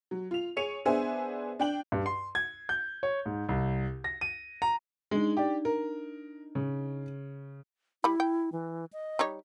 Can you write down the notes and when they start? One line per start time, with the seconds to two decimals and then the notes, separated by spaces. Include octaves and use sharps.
0.11 F#3
0.31 F4 F7
0.56 G#4 C#5 C#7 D#7 F7
0.85 B3 D4 G#4 C5 E5 G#5
1.60 D4 G5 F#7
1.92 G2
2.06 C6
2.35 G#6
2.69 G6
3.03 C#5
3.26 G#2
3.49 C2
4.04 A#6
4.21 D#7
4.62 A#5
5.11 G#3 D4 D#4
5.37 G4 D5
5.65 A#4
6.55 C#3
8.04 G3 E4 B5
8.20 G5
8.52 E3
8.93 D#5
9.19 G3 D#4 C#5